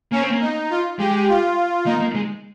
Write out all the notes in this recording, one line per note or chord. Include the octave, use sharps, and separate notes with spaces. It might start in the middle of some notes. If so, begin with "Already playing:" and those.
A#3 C#4
C4
A#3
D#4
F4
G#3 G4
F4
A#3 D#4
A#3
G#3